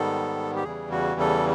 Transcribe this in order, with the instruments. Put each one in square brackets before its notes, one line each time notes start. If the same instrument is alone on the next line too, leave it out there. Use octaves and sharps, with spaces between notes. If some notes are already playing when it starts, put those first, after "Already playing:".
Already playing: [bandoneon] G#2 D#3 G3 B3 A4
G4
E2 C#3 E3 G3 G#4
F#4
A4